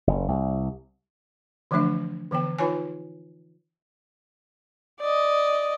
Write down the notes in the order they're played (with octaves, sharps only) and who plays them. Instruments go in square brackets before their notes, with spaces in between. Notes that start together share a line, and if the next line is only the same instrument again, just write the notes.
[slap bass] F#1
C2
[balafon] D3 E3 F3 A3 D4 E5
D3 E3 B3 G5
D#4 F4 B4 C#5 G#5
[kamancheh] D5 D#5